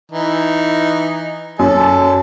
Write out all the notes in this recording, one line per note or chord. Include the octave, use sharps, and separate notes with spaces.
E3 D#4
F#2 A4